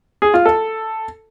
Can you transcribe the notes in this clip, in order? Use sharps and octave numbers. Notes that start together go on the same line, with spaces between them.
G#4
F4
A4